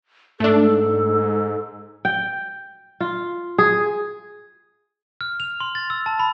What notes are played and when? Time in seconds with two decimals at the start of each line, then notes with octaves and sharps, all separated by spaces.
0.40 G#2 A3 D4 A4
2.05 G5
3.00 F4
3.58 G#4
5.21 F6
5.40 F7
5.60 C6
5.75 A6
5.90 E6
6.06 A5
6.19 B5